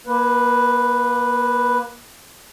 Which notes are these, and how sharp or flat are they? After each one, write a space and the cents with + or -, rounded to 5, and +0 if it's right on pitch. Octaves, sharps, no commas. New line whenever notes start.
A#3 +30 B4 +0